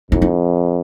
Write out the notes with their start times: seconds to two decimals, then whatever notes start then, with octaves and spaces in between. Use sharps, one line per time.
0.11 F2 D#4
0.22 D#4